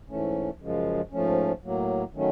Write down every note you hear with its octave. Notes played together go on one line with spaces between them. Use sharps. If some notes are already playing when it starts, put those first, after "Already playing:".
G#2 E3 A3 C#4
F#2 C#3 F3 G#3
G#2 F3 A3 C#4
A2 F#3 A#3
D#3 F#3 A3 C#4